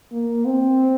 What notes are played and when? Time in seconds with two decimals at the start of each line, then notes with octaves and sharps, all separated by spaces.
0.12 A#3
0.46 C4